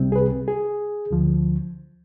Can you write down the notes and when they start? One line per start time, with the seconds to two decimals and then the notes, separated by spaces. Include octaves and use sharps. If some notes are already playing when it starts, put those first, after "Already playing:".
Already playing: C2 C3 G3 C4
0.12 G#4
0.16 B4
0.48 G#4
1.11 D2 D3 F3